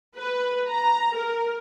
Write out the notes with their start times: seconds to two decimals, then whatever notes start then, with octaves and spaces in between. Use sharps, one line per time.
0.16 B4
0.68 A#5
1.14 A#4